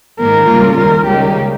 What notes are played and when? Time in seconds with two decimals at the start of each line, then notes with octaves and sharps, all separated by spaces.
0.19 G#2 D#3 A#3 A#4
0.48 C#3 G3 A#3 F4
0.78 D#2 D#3 G3 A#4
1.07 C#2 C#3 G3 A#3 D#4 G4